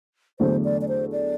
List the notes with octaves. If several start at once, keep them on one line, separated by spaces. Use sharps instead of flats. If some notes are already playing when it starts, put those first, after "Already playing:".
E2 D3 F#3 A3 C5
D5
D5
C5
D5